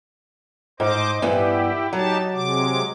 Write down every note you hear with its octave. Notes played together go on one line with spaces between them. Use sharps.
G#2 C5 D#5 D6
G2 E3 B3 E4 G4
F#3 D#4 G4 A5
C3 G#3 D6